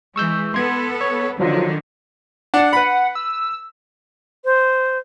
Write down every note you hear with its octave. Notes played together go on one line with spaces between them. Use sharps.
E3 G#3 C#6 E6 G6
B3 A4 C6 G#6
C#5
D3 D#3 F3 F#3 F4
D4 F#5 A5
B4 B5
E6
C5